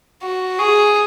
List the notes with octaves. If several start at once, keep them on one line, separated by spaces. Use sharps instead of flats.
F#4
G#4